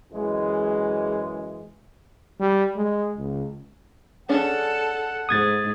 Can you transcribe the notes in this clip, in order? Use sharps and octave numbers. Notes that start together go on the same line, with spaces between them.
F#2 E3 G#3
G3
G#3
C#2
C#4 D4 G#4 A4 F#5
G#2 D#6 G#6 A6